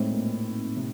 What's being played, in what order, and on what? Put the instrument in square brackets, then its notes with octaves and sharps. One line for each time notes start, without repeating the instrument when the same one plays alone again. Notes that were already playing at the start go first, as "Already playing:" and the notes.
Already playing: [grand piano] A2 [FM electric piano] G#3 C4 D#4
[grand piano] A#2
C3